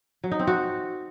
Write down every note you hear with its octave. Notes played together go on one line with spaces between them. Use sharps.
F#3
D#4
C4
F#4